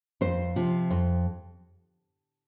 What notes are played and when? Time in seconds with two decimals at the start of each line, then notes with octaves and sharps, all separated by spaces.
0.21 F2 C5
0.56 C3 F3
0.90 F2